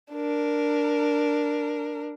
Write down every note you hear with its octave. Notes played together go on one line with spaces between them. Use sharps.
D4 A#4